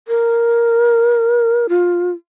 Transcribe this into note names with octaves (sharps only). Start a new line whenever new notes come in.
A#4
F4